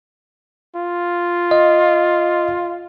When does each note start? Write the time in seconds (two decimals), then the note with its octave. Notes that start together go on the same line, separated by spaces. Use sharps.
0.75 F4
1.51 D#5